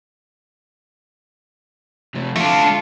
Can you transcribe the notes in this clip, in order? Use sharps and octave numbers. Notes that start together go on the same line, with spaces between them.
F2 C3
A3 D4 F4